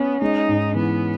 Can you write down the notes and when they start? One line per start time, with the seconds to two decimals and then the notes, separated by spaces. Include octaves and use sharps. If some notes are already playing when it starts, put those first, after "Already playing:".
Already playing: B3 C#4
0.22 G#3 D#4
0.48 G#2
0.75 E3 B3